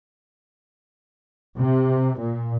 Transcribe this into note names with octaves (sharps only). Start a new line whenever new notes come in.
C3
A#2